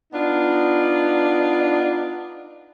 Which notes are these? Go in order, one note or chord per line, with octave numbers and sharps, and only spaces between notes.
B3 D4 D#4 F4